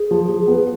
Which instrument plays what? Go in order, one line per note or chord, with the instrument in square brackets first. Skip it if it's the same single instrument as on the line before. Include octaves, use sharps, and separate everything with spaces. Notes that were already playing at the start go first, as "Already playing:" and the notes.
Already playing: [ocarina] G#4
[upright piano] F3
F3
B3